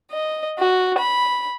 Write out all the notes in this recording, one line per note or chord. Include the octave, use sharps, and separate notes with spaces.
D#5
F#4
B5